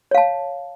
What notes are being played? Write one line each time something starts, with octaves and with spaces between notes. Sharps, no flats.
C#5 F5 A5